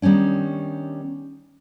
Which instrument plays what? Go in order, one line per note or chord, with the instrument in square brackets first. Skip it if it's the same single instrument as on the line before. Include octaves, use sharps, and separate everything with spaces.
[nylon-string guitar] D#3 G3 B3 C#4 D4